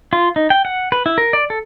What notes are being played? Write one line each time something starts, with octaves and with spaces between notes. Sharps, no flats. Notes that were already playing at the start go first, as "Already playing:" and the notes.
F4
D#4
G5
F#5
B4
E4
A#4
D5
A4